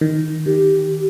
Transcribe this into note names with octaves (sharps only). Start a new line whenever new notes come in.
D#3
D#3 G4